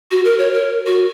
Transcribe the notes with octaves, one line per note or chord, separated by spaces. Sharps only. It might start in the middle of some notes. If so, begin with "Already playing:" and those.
F#4
A#4
C#5
A#4
F#4